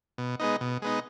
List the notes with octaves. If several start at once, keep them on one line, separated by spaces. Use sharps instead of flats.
B2
G#3 B3 D#4
B2
G#3 B3 D#4